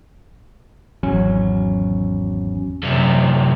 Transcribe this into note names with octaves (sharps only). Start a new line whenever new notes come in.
G#1 E2 F#3 C#4
F#2 C3